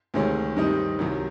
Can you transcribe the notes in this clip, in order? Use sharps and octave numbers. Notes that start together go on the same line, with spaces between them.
D2 C3 D#3 G#3 C#4
G2 D#3 G3 C4 D#4
C2 C3 D#3 F#3